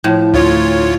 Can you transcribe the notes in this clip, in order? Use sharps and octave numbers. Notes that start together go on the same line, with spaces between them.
A2 F3
D2 F4 C#5